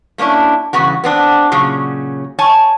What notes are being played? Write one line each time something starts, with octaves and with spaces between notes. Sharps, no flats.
A3 A#3 C#4 D4 E4
E2 G2 C#3 B3 F#4
B3 C4 D4
A#2 C#3 F#3 C#4
C#5 G#5 A5